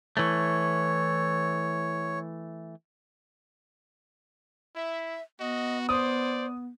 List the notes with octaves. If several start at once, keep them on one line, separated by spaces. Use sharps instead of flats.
E3 A3 C#5
E4 E5
B3 F#4 D#5
C5 D5 D#6